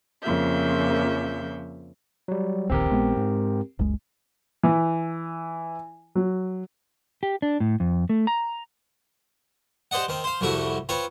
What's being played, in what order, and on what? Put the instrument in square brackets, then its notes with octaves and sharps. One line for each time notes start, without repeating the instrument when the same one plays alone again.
[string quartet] F2 C#3 F3 A#3 E5 G6
[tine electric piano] F#3 G3
[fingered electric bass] D1 A#1 D#2 [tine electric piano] C4 G4 A#4
[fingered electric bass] A#1 G#3 B3
G#2
F#1 C#2 G#3
[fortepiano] E3
F#3
[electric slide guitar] G4
D4
A2
F2
A3
A#5
[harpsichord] G4 C5 D5 D#5 F#5
D#3 C4
C5 F5
C2 F2 G3 A3 E4 F#4
C4 F4 B4 C#5